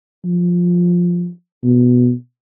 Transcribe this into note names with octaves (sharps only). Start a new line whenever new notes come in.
F3
B2